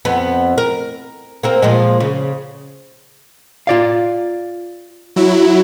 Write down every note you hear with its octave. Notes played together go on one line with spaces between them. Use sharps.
F2 B3
A#4
A#3 C4 A#4
A#2 F3 G#3
C#3
F4 D5 F5
F#3 E4